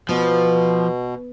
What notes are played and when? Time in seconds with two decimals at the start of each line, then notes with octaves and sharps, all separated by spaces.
0.09 B2 F3 B3